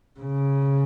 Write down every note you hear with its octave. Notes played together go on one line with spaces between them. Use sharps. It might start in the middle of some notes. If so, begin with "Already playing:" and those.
C#3